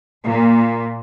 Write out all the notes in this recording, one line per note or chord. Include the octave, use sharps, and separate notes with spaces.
A#2